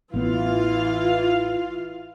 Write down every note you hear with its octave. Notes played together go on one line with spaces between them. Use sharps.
A1 E3 B3 F4 F5